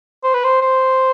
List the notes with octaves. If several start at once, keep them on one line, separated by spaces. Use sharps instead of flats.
C5
B4
C5
C5